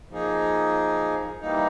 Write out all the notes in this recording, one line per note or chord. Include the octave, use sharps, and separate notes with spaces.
F3 A#3 D#4 G#4
E3 G3 A#3 D#4